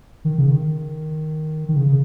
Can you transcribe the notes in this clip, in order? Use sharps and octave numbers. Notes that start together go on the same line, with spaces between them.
D#3
C#3
D#3
D#3
C#3
C#3